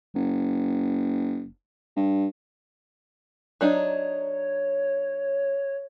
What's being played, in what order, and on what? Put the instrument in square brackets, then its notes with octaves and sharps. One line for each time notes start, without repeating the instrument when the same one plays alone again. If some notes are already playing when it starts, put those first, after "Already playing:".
[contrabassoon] F#1
G2
[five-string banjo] F#3 D4 D#4 [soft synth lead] C#5